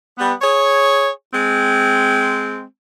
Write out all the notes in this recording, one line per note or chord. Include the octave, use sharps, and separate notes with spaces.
G3 B3
G#4 C#5
G#3 C4